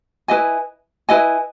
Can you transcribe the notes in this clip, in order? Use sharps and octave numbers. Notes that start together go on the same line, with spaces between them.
E4 B4 D#5 G#5
E4 B4 D#5 G#5